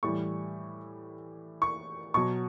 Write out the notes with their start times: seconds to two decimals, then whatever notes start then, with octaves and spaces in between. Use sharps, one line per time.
0.03 A2 E3 G3 C#6
1.62 C#6
2.14 B2 F#3 C#6